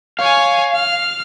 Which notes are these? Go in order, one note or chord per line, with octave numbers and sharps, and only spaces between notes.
C#5 F5 G#5
F6